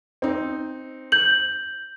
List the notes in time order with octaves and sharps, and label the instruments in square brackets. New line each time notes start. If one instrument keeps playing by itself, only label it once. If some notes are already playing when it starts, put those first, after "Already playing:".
[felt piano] C4 D#4
[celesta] G6 F#7